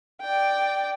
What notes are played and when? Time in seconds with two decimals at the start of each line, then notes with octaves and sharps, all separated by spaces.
0.21 D5 G5